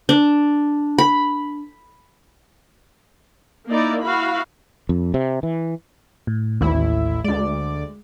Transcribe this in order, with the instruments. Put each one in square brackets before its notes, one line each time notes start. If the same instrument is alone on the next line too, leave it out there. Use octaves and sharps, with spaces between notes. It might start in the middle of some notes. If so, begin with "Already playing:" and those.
[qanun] D4
B5
[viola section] A#3 D#4 E4 D5
E4 F#4 F5 B5
[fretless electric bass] F2
C3
E3
[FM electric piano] A2
[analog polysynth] A1 E4 [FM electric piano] D#2
[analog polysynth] D2 D5 [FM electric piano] G#3